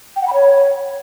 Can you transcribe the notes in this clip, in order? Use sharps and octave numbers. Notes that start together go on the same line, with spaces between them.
G5
F#5
B5
C#5